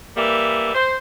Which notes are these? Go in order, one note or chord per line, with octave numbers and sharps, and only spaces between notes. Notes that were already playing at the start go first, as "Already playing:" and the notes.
E3 G3 A#3 E5
C5